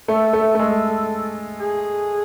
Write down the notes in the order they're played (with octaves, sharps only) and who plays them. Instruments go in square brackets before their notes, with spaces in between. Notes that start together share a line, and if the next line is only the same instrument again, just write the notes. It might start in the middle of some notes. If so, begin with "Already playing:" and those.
[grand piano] A3 [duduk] A4
[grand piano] A3
A3
G#3
[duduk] G#4